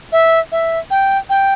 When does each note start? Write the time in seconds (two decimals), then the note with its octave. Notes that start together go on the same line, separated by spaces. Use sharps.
0.12 E5
0.52 E5
0.91 G5
1.30 G5